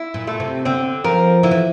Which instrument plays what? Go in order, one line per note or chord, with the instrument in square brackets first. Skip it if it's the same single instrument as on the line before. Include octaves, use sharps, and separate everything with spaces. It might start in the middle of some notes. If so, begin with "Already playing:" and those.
Already playing: [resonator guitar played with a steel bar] E4
[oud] A#2
[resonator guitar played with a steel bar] A3
[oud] C3
[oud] D3 [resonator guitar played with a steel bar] C4
[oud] F3 [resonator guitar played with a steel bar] A#4
[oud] D3 [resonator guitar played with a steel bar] E4
[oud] E3